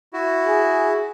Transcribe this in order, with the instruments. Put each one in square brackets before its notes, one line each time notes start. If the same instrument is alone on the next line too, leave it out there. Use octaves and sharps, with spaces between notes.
[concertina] E4 F#4
[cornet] G#4